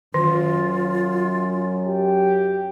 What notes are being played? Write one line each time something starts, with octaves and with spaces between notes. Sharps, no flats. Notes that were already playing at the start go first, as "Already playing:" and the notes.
F#2 D#3 F4
G4